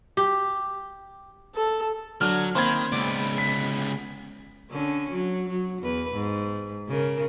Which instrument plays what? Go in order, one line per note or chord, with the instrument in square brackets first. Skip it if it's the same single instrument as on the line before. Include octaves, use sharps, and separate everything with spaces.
[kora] G4
[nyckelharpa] A4
[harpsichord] D3 [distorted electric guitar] F#3 [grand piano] F6
[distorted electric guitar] D#3 [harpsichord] A#3 C4 [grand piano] C5 B5 G#6
[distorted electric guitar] C#2 B3 [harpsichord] D5
[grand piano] B6
[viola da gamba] D3 C#4
F#3
F#3
E2 B4
G#2
C#3 A#4